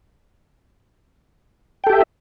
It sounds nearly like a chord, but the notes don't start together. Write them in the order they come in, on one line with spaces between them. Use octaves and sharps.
G5 A4 G4 E5